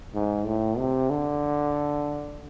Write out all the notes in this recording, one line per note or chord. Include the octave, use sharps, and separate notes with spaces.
G#2
A2
C3
D3